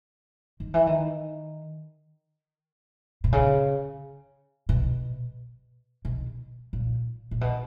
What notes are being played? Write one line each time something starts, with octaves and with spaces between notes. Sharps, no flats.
D#3
E3
D#3
B2
C#3
B2
B2
A#2
A#2
B2